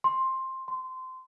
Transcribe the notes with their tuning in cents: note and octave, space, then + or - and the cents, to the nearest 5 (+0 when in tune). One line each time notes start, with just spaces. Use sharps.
C6 +10
C6 -20